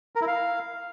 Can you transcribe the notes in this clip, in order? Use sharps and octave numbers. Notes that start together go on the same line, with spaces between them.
A#4
E4
F5